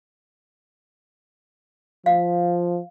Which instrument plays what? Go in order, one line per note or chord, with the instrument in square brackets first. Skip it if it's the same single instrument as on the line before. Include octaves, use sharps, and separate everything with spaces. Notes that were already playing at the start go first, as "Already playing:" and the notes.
[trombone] F3 [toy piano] F5